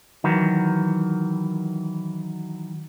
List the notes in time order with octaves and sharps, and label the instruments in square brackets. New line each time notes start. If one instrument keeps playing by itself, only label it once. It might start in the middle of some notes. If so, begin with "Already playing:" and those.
[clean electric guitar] D#3 E3 F#3